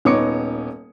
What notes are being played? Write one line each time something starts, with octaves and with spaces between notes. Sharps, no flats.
D#1 B3 D#4 C#5 D6 C#7